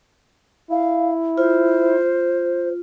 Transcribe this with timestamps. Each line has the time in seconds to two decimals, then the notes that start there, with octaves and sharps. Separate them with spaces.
0.71 E4 F5
1.38 F4 C5